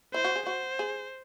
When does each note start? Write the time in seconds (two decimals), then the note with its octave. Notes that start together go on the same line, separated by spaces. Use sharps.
0.14 E4 C5
0.25 F#4
0.36 G#4
0.46 F#4 C5
0.79 G#4